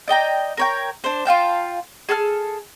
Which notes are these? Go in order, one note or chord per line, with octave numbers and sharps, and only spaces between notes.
D5 D#5 G5 A#5
A#4 C#5 G5
D4 C5
F4 F5 G5 A5
G#4 A4 A5 F6